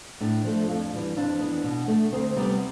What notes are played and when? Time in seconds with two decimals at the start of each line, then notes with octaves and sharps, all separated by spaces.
0.20 A2 D4
0.44 F3 A3
0.68 F2
0.93 E3 G3
1.16 F2 D4
1.40 E3 B3
1.64 B2
1.88 A3
2.12 D2 C4
2.36 C3 G3 B3